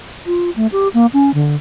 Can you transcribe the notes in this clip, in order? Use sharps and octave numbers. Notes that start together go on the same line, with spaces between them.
F4
A3
G4
A#3
C#4
D3